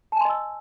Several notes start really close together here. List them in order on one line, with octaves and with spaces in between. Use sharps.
A5 G#5 C6 D#5 E6